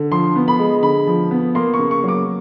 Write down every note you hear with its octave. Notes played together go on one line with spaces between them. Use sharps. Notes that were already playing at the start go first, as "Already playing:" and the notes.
Already playing: D3
F3 C6
B3
B5
G#3
D3 B5
F3
B3
A#3 C6
C#6
C#3
C#6
F#3 D6